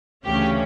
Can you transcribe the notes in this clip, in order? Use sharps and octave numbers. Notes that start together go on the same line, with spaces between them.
D2 C#3 E3 A3 C#4 G4